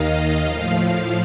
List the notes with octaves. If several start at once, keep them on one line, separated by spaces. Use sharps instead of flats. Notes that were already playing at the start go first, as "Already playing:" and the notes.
Already playing: D#2 D#3 D#5 F5
A2 F3 F5
F5